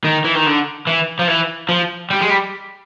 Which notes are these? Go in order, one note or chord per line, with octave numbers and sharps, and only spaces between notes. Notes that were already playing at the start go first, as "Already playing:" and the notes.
D#3
E3
D#3
D3
E3
F3
E3
F3
G3
G#3
G3